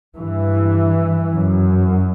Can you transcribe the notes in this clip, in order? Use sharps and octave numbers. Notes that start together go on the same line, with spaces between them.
G2 E3
F#2